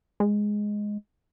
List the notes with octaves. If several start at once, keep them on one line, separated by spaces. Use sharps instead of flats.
G#3